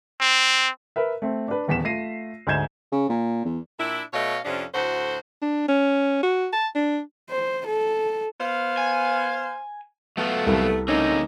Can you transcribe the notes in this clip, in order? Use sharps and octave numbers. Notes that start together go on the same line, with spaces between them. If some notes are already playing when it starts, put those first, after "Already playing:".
C4
A#4 B4 E5
A3 C4
D4 B4
D#1 E2 B6 E7
A3 F4 A#6 C7 D#7
D2 G#2 G#5 G6 G#6 E7
C#3
A#2
E2
A#2 D4 E4
B2 A3 C#5 D#5 F5
F2 C3 F3 C#4 D4
D2 A2 F#4 C5
D4
C#4
F#4
A5
D4
C5
A4
B3 C5 F5
G#5
F#3 A3 B3 F4 F#4
C2 A4
C#3 A3 A#3 C4 C#4 D#4